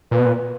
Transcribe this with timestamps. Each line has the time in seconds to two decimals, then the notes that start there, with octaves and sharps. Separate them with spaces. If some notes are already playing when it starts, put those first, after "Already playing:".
0.11 A#2 B4
0.19 B2
0.26 A#2